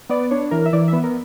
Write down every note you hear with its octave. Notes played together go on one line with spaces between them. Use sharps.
B3 D5
D4 C#5
E3 A#4
E5
E3 D5
B3 E5
A#4